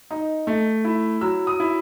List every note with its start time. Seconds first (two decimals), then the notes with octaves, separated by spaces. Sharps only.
0.11 D#4
0.47 A3
0.85 E4
1.21 F#3 E6
1.47 D#6
1.60 E4